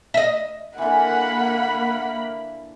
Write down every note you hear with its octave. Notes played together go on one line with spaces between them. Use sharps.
D#5 E5
D3 E3 A#3 F#5 B5